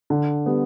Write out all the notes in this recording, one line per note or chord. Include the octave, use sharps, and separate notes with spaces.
D3
G3 B3